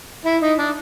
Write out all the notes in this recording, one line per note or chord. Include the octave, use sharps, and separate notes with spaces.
E4
D#4
D4